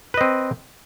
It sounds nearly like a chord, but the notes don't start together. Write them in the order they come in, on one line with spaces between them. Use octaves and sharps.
B4 D#5 C4